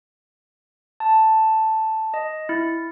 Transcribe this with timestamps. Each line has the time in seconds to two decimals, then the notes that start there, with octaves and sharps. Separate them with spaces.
1.00 A5
2.14 D#5
2.49 E4